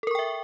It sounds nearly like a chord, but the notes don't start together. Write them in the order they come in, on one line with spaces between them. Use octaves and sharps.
A4 A#4 C#6 G5 E5